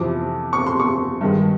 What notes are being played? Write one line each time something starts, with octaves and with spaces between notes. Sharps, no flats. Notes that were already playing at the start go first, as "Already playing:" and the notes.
Already playing: F2 C3 E3 D6
C#6
C6
C#6
G2 D#3 G#3